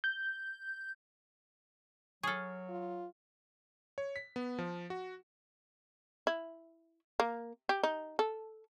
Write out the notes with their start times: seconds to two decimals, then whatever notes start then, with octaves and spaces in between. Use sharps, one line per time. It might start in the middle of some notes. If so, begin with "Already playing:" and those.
0.04 G6
2.23 F#3 G#4 A4 C#6 F6
2.69 F4
3.98 C#5
4.16 B6
4.36 B3
4.59 F3
4.90 F#4
6.27 E4
7.20 A#3
7.69 G4
7.83 D#4
8.19 A4